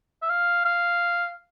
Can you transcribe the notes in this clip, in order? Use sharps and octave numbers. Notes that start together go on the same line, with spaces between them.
E5
F5
F5